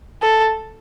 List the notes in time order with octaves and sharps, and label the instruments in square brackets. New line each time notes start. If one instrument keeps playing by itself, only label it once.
[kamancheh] A4